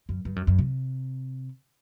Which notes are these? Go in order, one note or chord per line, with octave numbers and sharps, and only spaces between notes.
F#2
G2
F#2
F#2
C3